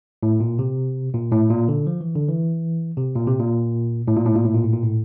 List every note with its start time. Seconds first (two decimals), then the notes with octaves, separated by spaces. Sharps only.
0.23 A2
0.40 A#2
0.59 C3
1.14 A#2
1.32 A2
1.50 A#2
1.69 D3
1.87 F3
2.01 E3
2.15 D3
2.29 E3
2.97 C3
3.15 A#2
3.27 C3
3.40 A#2
4.08 A2
4.17 A#2
4.25 A2
4.35 A#2
4.45 A2
4.54 A#2
4.64 A2
4.73 A#2
4.83 A2